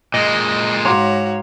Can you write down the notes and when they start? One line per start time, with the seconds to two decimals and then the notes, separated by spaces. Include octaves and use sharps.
0.14 A#2 G#3 D#5
0.85 G#2 F#4 C#5 F5 A#5 C6 D6